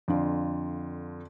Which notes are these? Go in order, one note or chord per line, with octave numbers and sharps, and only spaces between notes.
F2 D3 F4